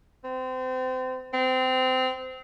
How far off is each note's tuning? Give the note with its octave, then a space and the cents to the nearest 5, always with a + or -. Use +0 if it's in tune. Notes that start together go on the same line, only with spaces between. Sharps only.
C4 -30
C4 -25